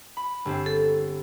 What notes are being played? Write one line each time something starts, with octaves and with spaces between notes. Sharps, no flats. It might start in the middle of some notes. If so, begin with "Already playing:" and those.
B5
G1 C4
A4